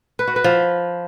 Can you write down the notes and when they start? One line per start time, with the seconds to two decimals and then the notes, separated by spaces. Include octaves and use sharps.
0.19 B4
0.28 F#4
0.36 B4
0.44 F3